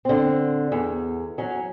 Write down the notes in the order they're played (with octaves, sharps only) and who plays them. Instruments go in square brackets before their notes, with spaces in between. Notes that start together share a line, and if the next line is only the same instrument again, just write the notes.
[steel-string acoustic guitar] D3 C4
E2
F#3 C#4